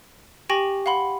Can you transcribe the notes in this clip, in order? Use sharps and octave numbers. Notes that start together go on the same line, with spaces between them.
G4 G5 G#5 C#6 A#6 F#7
F5 F#5 B5 C6